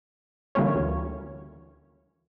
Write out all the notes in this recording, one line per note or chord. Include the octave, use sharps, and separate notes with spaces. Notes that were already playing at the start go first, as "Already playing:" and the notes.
D3 E3 G3 A#3 C#4 C#5
D2